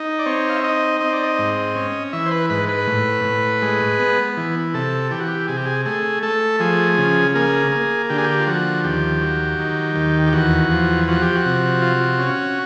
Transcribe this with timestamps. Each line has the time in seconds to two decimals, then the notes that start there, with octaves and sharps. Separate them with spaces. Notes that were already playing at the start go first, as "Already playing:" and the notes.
Already playing: D#4
0.19 D5
0.26 C4 C#5
0.49 F5
0.56 E5
0.63 D#4 D#5
1.00 C4 D#5
1.13 D5
1.24 D#5
1.38 G#2
1.76 C#4
2.13 E3 E5
2.26 C5
2.31 B4
2.50 G#2 B4
2.69 B4
2.87 A2
3.25 A2
3.62 G#3
3.99 B3
4.37 E3
4.74 C3 A4
5.11 E3 G4
5.20 F#4
5.28 G4
5.48 C3 G#4
5.57 G4
5.66 G#4
5.86 A3 G#4
6.23 A3 A4
6.60 F3 G#4
6.98 C#3
7.35 A#3 G#4
7.72 A#3
8.09 D3 G4
8.18 G#4
8.24 G4
8.39 F4
8.47 F3 F#4
8.84 D#2 G4
9.21 F#3
9.59 D#3
9.96 D#2
10.27 G4
10.33 E2 F#4
10.71 F3
11.08 F3 F#4
11.22 G4
11.35 F#4
11.45 C3
11.82 F4
12.19 C#4